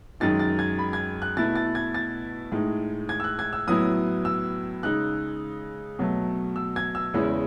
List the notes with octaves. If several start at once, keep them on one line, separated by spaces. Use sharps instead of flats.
F#2 D#3 G#3 D#4 A6
A6
G#6
B5
G#6
F#6
B2 A3 E4 A6
A6
G#6
A6
A2 G#3 D#4
G#6
E6
F#6
G#6
E6
A2 F#3 B3 E4 D#6
E6
C#3 G#3 D#4 F#6
B2 F#3 A3
E6
G#6
E6
E2 C#3 G#3 C#4 E4